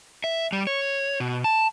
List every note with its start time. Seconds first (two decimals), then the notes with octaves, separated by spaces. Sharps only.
0.24 E5
0.52 G3
0.67 C#5
1.20 B2
1.44 A5